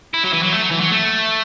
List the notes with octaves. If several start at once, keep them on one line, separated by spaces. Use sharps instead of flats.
E4
F#3
E3
F#3
A3
F#3
E3
F#3
A3